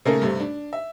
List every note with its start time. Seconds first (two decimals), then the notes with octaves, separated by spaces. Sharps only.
0.05 C#3 A3 A#3 C#4 A4 A#4
0.21 G2 C3 A3
0.40 D4
0.73 E5